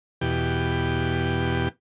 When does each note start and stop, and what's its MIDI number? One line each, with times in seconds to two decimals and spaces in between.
0.21 1.69 40
0.21 1.69 47
0.21 1.69 67